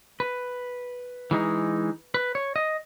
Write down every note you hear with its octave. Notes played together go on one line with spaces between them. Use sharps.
B4
E3 G#3 B3 D#4
B4
C#5
D#5